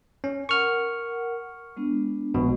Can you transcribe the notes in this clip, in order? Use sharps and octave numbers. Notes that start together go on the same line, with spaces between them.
C#4
A#4 F#5 C#6 F6
G#3 B3 D4
A#1 B2 G#3